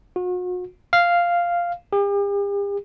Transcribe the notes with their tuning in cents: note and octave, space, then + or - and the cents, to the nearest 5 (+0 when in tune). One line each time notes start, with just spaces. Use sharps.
F#4 -40
F5 -5
G4 +45